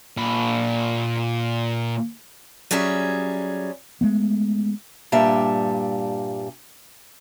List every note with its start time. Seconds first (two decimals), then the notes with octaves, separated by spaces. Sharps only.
0.17 A#2 B5
2.71 F#3 G3 C#4 G#4 E5
4.01 G#3 A3 B3
5.12 G2 A#2 G3 E5 A5